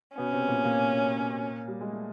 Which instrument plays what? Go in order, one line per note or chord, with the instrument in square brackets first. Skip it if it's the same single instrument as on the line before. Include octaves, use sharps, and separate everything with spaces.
[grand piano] B2 B3 [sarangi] C#4
[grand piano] C3 C4
B3
A#2 A#3
A#2 A#3
G3
G#3
A3